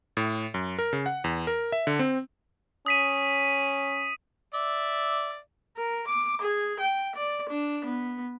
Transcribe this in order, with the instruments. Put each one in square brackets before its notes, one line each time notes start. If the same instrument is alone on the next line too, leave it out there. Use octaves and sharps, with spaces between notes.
[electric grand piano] A2
F#2
A#4
C#3
F#5
E2
A#4
E5
D3
C4
[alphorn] C#4 [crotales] D#6 B6 D#7
[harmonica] D5 E5
[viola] A#4
D6
G#4
G5
D5
D4
B3